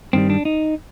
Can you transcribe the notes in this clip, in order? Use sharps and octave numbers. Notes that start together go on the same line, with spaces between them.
G2 D#3 G3 C4
D4
D#4